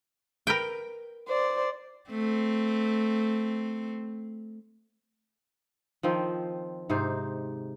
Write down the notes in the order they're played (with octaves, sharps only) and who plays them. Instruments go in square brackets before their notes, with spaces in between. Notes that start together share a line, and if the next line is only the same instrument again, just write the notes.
[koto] A#4 B4 G5
[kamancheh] C5 D5
[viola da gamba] A3 C4
[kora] D#3 F3 C4
G#2 C3 D#4 C5